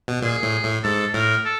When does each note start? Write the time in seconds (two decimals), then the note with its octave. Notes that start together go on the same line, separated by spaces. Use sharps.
0.08 B2
0.22 A#2 G#4
0.43 A2
0.64 A2
0.83 G#2 A4
1.13 A2 A#4
1.45 A4